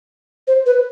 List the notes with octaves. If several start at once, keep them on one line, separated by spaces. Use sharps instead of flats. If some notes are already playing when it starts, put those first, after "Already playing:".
C5
B4